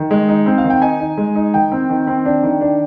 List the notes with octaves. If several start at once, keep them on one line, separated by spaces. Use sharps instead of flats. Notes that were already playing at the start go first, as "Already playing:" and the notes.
Already playing: D#3
G#3
D#4
C4
F5
D#3
G5
D#4 G#5
D#4
G#3
D#4
D#3 G5
C4
D#3
C4
D4
D#3
D4